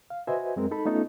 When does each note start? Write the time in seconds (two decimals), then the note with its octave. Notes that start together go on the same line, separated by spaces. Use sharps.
0.10 F5
0.27 F#4 B4 C5 D#5 E5 G#5
0.56 F#2 G#3 C4 A#4
0.71 D#4 A4 B5
0.86 A3 B3 C#4 D#4 F4 A4